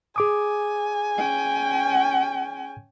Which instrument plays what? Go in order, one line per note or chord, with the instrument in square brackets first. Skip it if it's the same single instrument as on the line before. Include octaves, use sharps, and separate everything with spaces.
[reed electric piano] G#4 D6 D#6 [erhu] G#5
[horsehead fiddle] C#4 G5